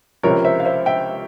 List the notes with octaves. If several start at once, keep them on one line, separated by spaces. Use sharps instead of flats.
C#2 C3 F3 A#4 C#5
C5 E5
F5
C5 E5
E5 G5